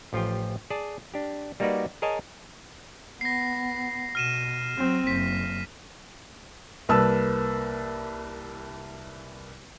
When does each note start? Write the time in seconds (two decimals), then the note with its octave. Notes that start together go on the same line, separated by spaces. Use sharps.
0.13 A1 F3 F4 G4 G5
0.70 G#4 D5 A5
1.14 D4 G4
1.60 G3 A#3 D#4 F#4 B4 D5
2.02 G#4 A#4 C#5 D#5 G#5 A5
3.21 B3 A#6 C7
4.15 B2 F6 D#7 E7
4.78 F#3 C4
5.07 F#1 B6
6.89 C2 A#3 B4 A5 E6